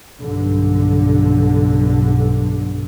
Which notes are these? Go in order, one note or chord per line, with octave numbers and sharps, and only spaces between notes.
B1 G2 D3